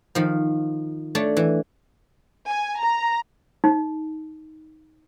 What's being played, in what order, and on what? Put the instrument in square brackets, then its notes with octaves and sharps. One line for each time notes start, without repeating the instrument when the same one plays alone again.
[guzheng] D#3 F3
A3 D4 C#5
E3
[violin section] G#5
A#5
[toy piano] D#4